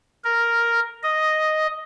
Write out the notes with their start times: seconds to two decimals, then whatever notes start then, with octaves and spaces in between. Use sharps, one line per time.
0.24 A#4
1.03 D#5